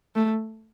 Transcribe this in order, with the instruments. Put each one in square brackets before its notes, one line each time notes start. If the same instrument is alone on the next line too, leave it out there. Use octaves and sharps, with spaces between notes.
[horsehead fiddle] A3